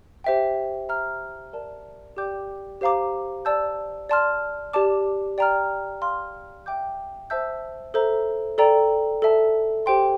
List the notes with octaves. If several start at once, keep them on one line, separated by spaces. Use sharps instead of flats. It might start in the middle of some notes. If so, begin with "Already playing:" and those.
G4 C5 E5 G5
E5 A#5 F6
A#4 D5 A5
G4 D5 G5 D6 G6
G4 C5 F5 A#5 D6
D5 A5 E6 G6
D5 A5 C6 F6
G4 D5 A5 D6
D5 G5 A#5 F6
F5 C6 F6
E5 G5 D6 G6
C5 E5 A5 E6 G6
A4 C5 E5 A#5
A4 D5 G5 A#5
A4 E5 A5
G4 C5 G5 C6